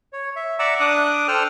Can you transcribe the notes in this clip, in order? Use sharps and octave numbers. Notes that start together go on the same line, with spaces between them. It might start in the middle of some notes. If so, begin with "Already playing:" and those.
C#5
E5
D5 E5 F#5 A#5 D6 E6
D4 D6 D#6 F#6
A4 C5 G5 E6 F6